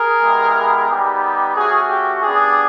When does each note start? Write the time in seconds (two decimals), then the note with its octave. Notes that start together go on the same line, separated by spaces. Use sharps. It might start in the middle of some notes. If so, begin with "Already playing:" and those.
Already playing: G#4 A#4
0.22 G#3 B3 E4 G4
0.88 G3 B3 D#4 G4
1.55 A3 C#4 F#4 G#4
1.89 G4
2.22 B3 D4 G4 G#4